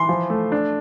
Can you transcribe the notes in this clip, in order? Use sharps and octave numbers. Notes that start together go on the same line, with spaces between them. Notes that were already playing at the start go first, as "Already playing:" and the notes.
Already playing: E3 C6
F3
A3
D4